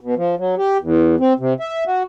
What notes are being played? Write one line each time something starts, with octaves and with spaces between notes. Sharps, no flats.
B2
F3
F#3
G4
E2
C4
C3
E5
F#4